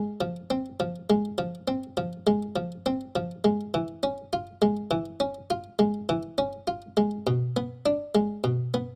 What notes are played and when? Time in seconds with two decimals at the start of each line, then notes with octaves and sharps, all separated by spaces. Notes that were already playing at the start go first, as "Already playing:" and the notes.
Already playing: G#3
0.21 F3
0.50 C4
0.80 F3
1.10 G#3
1.38 F3
1.68 C4
1.97 F3
2.27 G#3
2.56 F3
2.86 C4
3.16 F3
3.44 G#3
3.74 E3
4.03 C#4
4.33 F4
4.62 G#3
4.91 E3
5.20 C#4
5.50 F4
5.79 G#3
6.09 E3
6.38 C#4
6.67 F4
6.97 G#3
7.27 B2
7.57 B3
7.86 D4
8.15 G#3
8.44 B2
8.74 B3